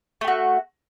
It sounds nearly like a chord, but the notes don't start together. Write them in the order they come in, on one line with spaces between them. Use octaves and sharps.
A3 G4 F#4